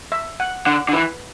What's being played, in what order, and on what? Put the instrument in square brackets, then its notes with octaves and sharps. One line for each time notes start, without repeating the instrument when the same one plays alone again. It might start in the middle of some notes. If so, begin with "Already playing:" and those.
[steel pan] E5
F#5
[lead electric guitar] D3 [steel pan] F#5
[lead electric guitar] D3
[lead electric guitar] E3 [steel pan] B4